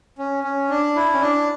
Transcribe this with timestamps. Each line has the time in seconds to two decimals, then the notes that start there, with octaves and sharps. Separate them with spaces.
0.18 C#4
0.44 C#4
0.70 D4
0.95 E4
1.13 C#4
1.21 D4